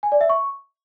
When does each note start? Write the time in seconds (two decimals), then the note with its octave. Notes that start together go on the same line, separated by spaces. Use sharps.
0.03 G#5
0.12 D5
0.21 E5
0.29 C#6